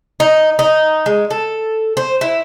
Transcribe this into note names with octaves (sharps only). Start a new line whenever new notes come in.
D#4
D#4
G#3
A4
C5
E4